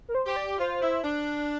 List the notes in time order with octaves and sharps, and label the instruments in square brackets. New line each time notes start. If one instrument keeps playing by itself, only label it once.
[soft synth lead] A#4
C5
[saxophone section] G4 [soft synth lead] C5
[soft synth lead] D5
[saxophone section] F4 [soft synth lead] C5
[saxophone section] E4
D4